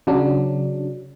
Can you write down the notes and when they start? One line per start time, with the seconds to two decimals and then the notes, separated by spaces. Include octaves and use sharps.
0.07 C#3 F#3 D4